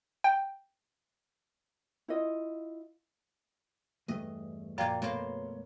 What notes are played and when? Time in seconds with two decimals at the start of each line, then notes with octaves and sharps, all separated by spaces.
0.24 G5
2.08 E4 F4 D#5
4.08 E2 G2 A3 D#5
4.78 F#2 A#2 F3 A#3 D5 F5 G5
5.02 B2 A3 A#3 C#5 C6